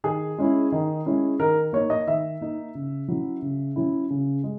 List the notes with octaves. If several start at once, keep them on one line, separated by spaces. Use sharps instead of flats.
D#3 G#4
G#3 C#4 E4
D#3
G#3 C#4 E4
D#3 A#4
A#3 D#4 C#5
D#5
D#3 E5
A#3 D#4
C#3
F#3 C#4 E4
C#3
F#3 C#4 E4
C#3
G#3